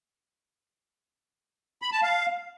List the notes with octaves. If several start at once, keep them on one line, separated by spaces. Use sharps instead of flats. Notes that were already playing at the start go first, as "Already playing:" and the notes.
B5
A5
F5